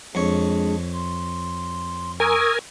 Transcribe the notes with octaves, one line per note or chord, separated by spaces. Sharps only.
F2 G#3 D4 G#4 C#5
C6
A#4 G#5 C#6 D#6 E6